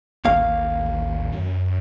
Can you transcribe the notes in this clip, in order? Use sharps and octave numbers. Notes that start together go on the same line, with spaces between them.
A1 D#2 A#3 F5
F#2